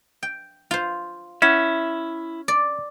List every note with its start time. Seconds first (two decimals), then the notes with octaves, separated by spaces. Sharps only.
0.23 G5
0.71 F4 C5
1.42 C#4 E4 E5 F#5
2.48 D5